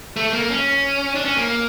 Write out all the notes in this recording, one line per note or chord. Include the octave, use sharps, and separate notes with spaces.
A3
A#3
C#4
D4
C#4
A#3